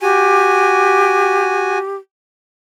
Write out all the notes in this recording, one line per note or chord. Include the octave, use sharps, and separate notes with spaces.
F#4 G4 G#5